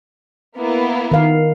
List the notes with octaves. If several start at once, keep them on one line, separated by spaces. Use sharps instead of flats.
A#3 B3 E4
D#3 F5